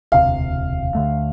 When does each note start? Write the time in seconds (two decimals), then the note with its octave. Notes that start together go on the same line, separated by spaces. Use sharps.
0.12 E1 D2 C3 F5
0.95 D2 D3 A3